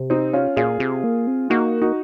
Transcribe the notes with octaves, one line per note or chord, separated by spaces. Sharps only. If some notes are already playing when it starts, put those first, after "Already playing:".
Already playing: C3
C4 D#4
C#4 F4
A#2 F4 G#4
C3
A#3
C4
A#3 D#4 F#4
D#4 F#4